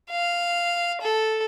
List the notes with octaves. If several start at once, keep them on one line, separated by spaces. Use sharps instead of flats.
F5
A4